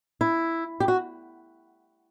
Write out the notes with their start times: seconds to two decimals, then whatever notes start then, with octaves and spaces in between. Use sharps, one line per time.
0.21 E4
0.80 G4
0.88 F#4